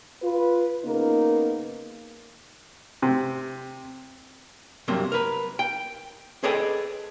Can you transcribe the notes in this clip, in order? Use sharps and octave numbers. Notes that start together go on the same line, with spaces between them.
F4 B4
C#3 A#3 B3 D#4 A#4
C3
G2 C3 F#3 A#3
A#4 B4
G5
G#4 A4 B4 D5 D#5 G5